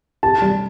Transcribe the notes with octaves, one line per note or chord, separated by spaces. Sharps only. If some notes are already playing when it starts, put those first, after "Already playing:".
G4 A5
G3